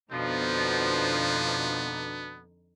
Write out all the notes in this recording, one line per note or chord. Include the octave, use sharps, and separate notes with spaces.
F2 B2 D3 F3 B3 D4 D#4